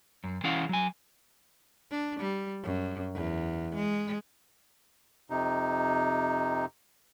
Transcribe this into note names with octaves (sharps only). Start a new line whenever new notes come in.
F#2
E3 C#4 E4 G#4 F5 F#5
F#3 G#5
D4
G3
F#2
E2
G#3
F2 C3 D#4